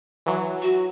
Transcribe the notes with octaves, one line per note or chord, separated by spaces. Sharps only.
E3 F#3
F#4